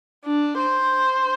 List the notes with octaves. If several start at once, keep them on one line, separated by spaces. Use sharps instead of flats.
D4
C5